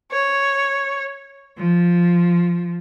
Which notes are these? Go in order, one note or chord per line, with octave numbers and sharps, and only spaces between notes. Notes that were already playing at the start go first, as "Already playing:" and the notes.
C#5
F3